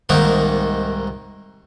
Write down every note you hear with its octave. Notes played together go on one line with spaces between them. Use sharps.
C2 G#2 D#3 A#3 D#4 F#5